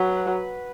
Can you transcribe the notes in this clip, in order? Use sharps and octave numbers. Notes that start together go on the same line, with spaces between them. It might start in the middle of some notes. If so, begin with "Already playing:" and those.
Already playing: F#3 B4